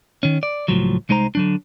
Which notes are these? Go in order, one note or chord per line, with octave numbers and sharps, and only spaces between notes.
D#3 C#4
D5
C#2 A2 F3 F#3
C2 G#3 D#4 C5 A#5
D3 F#3 D4